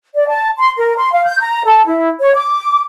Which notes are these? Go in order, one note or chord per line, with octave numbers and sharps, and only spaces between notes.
D5
A5
C6
A#4
C6
F5
G6
A#5
A4
E4
C#5
D6